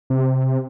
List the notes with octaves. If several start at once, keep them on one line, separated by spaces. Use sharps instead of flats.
C3